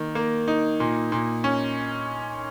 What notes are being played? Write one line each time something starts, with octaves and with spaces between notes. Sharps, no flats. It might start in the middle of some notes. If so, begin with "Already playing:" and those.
Already playing: D#3 A#3
A#3
D#4
A#2
A#2
C#4